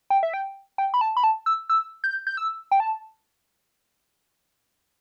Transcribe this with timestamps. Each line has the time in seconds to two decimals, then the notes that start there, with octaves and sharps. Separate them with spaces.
0.10 G5
0.23 E5
0.34 G5
0.78 G5
0.94 B5
1.01 A5
1.17 B5
1.24 A5
1.46 E6
1.70 E6
2.04 G6
2.27 G6
2.37 E6
2.72 G5
2.80 A5